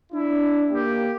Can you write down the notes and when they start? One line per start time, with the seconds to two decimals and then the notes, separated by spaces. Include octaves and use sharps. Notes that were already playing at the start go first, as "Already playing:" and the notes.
0.13 D4 E4
0.71 A#3 G4